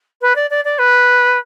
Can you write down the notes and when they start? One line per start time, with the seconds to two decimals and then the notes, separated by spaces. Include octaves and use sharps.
0.21 B4
0.36 D5
0.50 D5
0.65 D5
0.79 B4